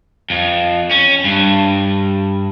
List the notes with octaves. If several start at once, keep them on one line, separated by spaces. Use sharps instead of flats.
F2
C#4
G2